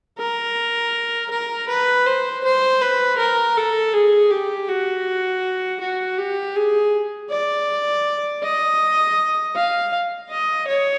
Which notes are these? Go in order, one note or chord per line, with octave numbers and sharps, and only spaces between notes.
A#4
A#4
B4
C5
C5
B4
A#4
A4
G#4
G4
F#4
F#4
G4
G#4
D5
D#5
F5
D#5
C#5